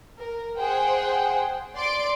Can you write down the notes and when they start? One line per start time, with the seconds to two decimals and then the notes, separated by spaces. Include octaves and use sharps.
0.19 A#4
0.57 G#4 C5 F#5 G5
1.75 D5 C6 D7